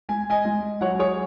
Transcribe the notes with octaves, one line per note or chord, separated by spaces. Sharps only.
G#3 G#5
D#5 G#5
G#3
F#3 C#5 F#5
G#4 C#5